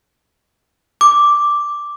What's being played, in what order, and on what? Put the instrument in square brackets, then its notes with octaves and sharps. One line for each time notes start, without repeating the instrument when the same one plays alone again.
[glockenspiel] D6